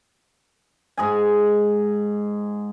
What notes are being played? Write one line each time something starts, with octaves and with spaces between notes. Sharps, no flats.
G#2 G#4 G#5